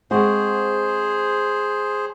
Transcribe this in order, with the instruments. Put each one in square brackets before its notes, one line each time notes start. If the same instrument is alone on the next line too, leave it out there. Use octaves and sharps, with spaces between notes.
[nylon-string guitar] G#3 C4 F#4 [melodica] G#4 C5